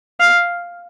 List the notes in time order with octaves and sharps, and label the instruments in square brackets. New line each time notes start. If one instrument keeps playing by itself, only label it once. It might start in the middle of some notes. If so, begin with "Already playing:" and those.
[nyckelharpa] F5